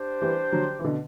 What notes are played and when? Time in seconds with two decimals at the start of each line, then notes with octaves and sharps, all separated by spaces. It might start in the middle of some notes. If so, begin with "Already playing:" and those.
Already playing: D4 G4 C5
0.22 E3 G3
0.53 D3 F#3
0.79 E3
0.84 B2 D3